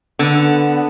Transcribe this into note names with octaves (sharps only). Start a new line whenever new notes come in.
D3 B3